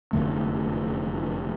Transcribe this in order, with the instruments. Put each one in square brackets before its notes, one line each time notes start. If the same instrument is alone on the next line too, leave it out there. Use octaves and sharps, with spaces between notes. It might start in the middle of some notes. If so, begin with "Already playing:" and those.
[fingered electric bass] F1 F#2 D3 A3